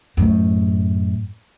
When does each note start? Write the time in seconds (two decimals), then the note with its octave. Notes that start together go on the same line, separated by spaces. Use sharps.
0.17 F#2 A2